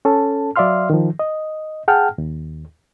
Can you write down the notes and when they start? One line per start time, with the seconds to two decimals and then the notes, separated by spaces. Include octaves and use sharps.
0.05 C#4 A4 A5
0.56 F#3 D5 E5 F5 C6 F6
0.90 D#3 F3
1.19 D#5
1.88 G#4 F#5 G5 A5 F6
2.18 D#2